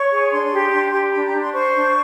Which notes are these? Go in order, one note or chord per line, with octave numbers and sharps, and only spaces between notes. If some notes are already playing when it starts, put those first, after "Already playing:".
Already playing: C#5 C#6
G#4
D4 C6
G4
D4
G4
D4 B5
A#5
D4
C6
C5 C#6
D4